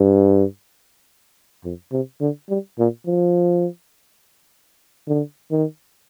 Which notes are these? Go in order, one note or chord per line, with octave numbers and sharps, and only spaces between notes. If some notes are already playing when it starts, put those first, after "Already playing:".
Already playing: G2
F2
C3
D3
G3
A#2
F3
D3
D#3